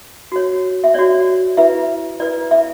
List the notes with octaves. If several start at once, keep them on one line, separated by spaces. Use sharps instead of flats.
F#4 C#5
E5
F#4 C#5 D5
E4 B4 E5
E4 B4 D5
E5